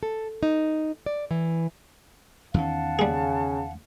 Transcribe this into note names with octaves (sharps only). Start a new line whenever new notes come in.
A4
D#4
D5
E3
E2 D#3 C#4 F5 F#5 A5
C#3 G3 G#4